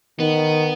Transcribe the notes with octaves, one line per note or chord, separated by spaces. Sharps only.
D#3 B3